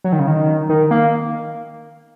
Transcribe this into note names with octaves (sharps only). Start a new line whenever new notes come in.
F#3
D#3
C#3
D#3
D#3
A#3